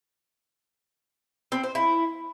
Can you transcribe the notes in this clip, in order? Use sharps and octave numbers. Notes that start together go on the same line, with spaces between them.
C4
C5
E4